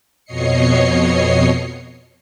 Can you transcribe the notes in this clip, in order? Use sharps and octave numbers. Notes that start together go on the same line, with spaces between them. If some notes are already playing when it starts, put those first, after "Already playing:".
F2 B2 C#5 D#5 C7 C#7